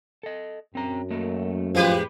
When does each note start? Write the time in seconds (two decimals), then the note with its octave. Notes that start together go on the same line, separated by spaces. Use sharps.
0.23 A4 D#5
0.75 F#2 C4 A#5
1.11 A3 A#3 D#5
1.75 F2 A2 F3 G#3 G4 B4 C5